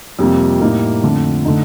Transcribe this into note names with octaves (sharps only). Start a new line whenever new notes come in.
F2 C3 G3 A#3
A2 G3 A#3 D#4
F2 D3 A3
D3 A3 D#4